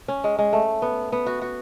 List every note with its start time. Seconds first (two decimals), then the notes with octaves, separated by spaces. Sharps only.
0.08 C#4
0.24 G#3
0.39 G#3
0.53 A3
0.82 B3
1.12 B3
1.26 F#4
1.42 F#4